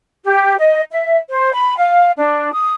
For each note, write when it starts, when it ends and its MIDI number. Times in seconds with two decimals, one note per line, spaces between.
0.23 0.55 67
0.57 0.81 75
0.90 1.16 76
1.30 1.51 72
1.52 1.76 83
1.77 2.10 77
2.16 2.53 62
2.53 2.73 87